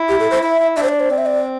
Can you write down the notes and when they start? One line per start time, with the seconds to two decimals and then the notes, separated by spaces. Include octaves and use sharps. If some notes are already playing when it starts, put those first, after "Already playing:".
Already playing: E4
0.09 G4
0.19 A4
0.31 C5
0.43 E4 E5
0.59 E4
0.76 D4 E5
0.83 C5
0.89 D5
1.00 C5
1.10 C4 D5
1.18 E5
1.26 D5